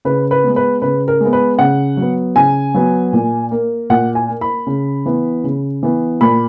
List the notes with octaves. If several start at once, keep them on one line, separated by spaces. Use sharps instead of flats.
C#3 B4
B4
G#3 B3
B4
C#3 B4
A#4
G#3 B3
B4
C#3 F#5
F#3 B3
C#3 G#5
F#3 B3
A#2
A#3
A#2 F#5
G#5
A#3
B5
C#3
E3 B3
C#3
E3 B3
A#2 B5